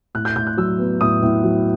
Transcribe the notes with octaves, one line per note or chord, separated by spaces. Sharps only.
A2 F#6
G6
A2 G6
F#6
F#3 E6
B3
A2 D#6
A2
F#3